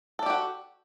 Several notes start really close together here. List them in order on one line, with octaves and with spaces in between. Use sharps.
A4 D5 G4 F#4